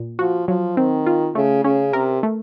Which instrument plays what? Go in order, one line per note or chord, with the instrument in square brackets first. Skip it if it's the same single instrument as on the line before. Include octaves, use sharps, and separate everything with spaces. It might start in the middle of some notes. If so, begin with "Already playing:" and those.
Already playing: [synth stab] A#2
[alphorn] F3 [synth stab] F#4
[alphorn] F3 [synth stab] F#3
[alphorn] D#3 [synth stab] C4
[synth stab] F4
[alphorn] C#3 [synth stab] A3
[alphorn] C#3 [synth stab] C#4
[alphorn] C3 [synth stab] A#4
[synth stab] A3